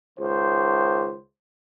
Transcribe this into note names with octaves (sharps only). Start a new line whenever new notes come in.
C#2 D#3 C5